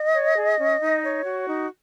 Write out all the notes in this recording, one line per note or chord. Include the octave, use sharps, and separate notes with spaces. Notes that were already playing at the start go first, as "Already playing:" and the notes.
Already playing: D#5
C#5
G#4
C#4
D#4
C#5
F#4
D#4